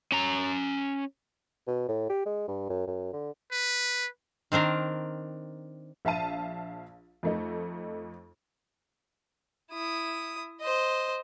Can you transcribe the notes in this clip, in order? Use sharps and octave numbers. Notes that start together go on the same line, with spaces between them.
C#4 A#5
B2
A2
G4
G#3
G2
F#2
F#2
D3
B4
D#3 C4 D4 A#4
A#1 E5 F5 A5 D#7
F2 A3 D#4
E4 D#6
C5 D#5